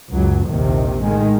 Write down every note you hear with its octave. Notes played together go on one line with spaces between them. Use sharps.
C#2 F#2 F#3
A#1 D#2 C3 D#3
A2 D#3 G#3